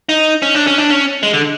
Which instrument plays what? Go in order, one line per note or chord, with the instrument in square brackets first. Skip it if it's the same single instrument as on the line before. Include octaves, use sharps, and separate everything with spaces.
[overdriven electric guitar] D#4
C#4
D4
C#4
D4
C#4
G#3
D3